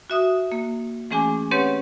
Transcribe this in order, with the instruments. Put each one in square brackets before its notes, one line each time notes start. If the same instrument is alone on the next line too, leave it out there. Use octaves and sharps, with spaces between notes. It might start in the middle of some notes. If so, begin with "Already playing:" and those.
[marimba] F#4 E5 D#6
A#3
E3 A3 C#4 G#4 G#5 D6
C4 C#4 G4 B4 C#5 F#5